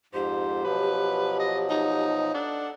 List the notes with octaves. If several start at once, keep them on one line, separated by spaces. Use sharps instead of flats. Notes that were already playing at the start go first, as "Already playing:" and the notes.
F2 G#2 G4 C5
B2 F3 F#3 B4
D#5
D#4
D4 A4 F#5